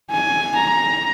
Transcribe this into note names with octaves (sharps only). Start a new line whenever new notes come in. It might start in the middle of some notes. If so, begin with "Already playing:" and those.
G#5
A#5